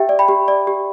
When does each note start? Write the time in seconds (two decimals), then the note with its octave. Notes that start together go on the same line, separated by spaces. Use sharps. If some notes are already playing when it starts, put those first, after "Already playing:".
Already playing: G4 E5 G5
0.09 D5
0.19 G5 B5
0.28 G4
0.48 D5
0.67 G4